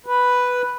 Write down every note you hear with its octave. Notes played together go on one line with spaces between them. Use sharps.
B4